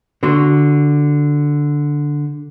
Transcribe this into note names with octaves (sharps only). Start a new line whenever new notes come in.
D3 F#4 C6